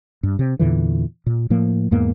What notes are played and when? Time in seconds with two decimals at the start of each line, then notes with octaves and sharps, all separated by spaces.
0.23 G2
0.39 C3
0.59 E2 A#2 D3 E3
1.26 A#2
1.50 A2 F3 A#3
1.91 E2 G#2 A#3 B3